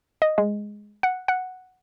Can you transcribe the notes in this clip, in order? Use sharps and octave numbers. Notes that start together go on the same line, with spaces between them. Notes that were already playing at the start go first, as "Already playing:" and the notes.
D#5
G#3
F#5
F#5